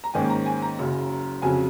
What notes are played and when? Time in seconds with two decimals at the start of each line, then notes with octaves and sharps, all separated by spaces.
0.04 A#5
0.14 G#2 D#3 A#3 C#4 G#5
0.30 A#5
0.46 G#5
0.62 A#5
0.79 F#1 F#2 C#3
1.42 F2 C#3 F#3 G#5